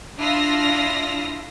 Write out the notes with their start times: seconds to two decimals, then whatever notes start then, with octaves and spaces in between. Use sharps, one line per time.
0.18 D4 E4 F4 D#6 F6 A#6